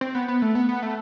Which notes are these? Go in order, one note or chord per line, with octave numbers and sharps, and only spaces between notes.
C4
B3
B3
A3
B3
B3
A3